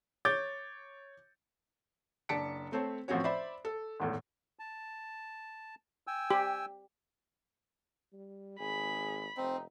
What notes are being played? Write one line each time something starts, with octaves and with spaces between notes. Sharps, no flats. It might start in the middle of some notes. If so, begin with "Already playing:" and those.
C#5 D6 G6 A6
F#1 D4 A5 B6 C#7 D7
A3 C4 C5 C#5 A5
A1 F3 C4 C#4 F#4 C#5
C5 D5 E5 B5
A4
G#1 E2 A2
A5
G5 G#5 E6
G4
G3
G#1 G#4 B5
F1 C4 D#4